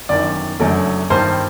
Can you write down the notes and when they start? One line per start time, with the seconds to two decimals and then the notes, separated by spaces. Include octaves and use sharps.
0.09 G1 F#2 D#3 D5
0.60 F#1 F#2 D3 F#3 A3
1.10 G1 G2 D#3 G3 C5